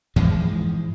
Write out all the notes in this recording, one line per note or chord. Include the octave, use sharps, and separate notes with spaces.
G#2 E3 F3 G#3